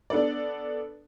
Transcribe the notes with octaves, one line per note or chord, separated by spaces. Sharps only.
B3 D4 A4 D5